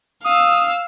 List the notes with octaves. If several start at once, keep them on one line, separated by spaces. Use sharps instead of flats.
F5 D#6 E6